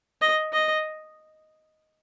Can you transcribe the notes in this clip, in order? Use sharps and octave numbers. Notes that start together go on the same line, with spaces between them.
D#5
D#5